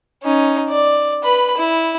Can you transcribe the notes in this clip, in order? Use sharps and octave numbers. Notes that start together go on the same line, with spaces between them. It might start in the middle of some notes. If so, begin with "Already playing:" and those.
C#4 D#4
D5
B4 B5
E4